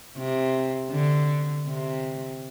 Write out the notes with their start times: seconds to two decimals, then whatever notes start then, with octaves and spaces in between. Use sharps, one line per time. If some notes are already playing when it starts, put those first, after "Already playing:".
0.17 C3
0.92 D3
1.67 C3